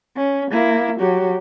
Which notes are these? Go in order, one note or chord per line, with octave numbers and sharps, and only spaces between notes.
C#4
A#3 E4
F#3 G4